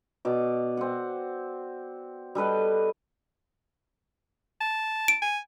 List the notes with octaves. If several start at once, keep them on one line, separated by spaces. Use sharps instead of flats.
B2 D5
C4 F#5
G3 A4 B4 D#5
A5
D7
G#5